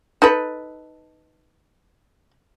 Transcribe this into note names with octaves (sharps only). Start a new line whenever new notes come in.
D#4 A4 B4